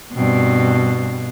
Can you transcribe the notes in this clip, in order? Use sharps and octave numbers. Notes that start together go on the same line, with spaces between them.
G2 B2 C4